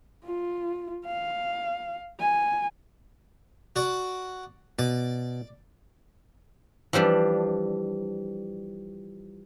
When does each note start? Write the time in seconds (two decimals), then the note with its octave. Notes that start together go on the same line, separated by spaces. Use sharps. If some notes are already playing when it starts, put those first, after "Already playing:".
0.25 F4
1.06 F5
2.20 G#5
3.76 F#4 D5
4.79 B2 D5
6.93 E3 F3 G3 D4